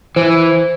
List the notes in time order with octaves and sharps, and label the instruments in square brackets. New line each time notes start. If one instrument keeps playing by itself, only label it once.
[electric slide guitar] E3 [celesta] C5